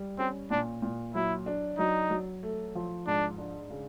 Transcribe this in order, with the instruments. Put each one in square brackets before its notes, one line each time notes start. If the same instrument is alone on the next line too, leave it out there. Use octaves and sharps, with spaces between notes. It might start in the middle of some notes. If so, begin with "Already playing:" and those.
Already playing: [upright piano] G3
[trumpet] C4 [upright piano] C#4
[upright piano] A#2 [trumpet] D4
[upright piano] A#2
[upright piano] F#3 [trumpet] E4
[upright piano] D4
[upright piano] F#3 [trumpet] D#4
[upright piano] F#3
A3
F3
[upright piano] G#2 [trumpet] D4
[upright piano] D4
C#3